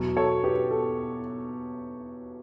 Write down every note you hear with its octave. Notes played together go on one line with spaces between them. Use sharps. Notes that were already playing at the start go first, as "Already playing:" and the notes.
Already playing: E2 B2 F#3
A4 C#5
G4 B4
A4